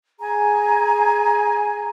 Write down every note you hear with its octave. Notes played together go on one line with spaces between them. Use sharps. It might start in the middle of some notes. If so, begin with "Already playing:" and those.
G#4 G#5 A#5